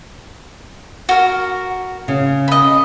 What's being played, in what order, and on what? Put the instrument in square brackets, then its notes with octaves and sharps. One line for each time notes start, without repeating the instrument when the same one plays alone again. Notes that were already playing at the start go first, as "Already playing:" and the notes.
[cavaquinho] F#4 A#4
[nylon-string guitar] C#3
[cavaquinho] D#5 B5